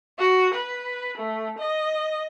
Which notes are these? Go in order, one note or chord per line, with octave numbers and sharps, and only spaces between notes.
F#4
B4
A3
D#5